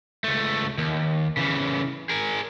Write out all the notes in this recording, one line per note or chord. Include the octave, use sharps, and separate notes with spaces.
C#2 A3
D#2
C#3 E3
G#4 A#4